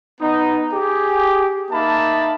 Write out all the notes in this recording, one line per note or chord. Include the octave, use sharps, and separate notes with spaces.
B3 D#4
G4 G#4
A#3 D#4 E5 A5 B5